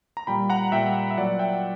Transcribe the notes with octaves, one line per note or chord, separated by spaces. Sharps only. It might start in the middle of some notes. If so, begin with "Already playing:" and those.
A#5
A#2 G3 G5 B5
F#5 A#5
A#2 G3 E5 G5
E5
A#2 F#3 D5 F#5
E5 G5